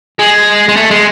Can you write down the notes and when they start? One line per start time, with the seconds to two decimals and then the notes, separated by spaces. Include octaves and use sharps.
0.19 G#3
0.68 G#3
0.77 A3
0.91 G#3